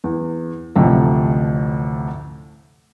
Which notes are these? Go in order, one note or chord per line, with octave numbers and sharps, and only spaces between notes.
E2
A1 D2 C3 F3 A3